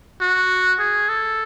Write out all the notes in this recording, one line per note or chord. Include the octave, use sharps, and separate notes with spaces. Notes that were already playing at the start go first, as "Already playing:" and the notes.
F#4
G#4
A4